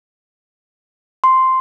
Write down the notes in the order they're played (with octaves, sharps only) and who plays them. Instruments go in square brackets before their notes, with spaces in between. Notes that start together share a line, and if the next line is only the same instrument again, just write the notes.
[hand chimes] C6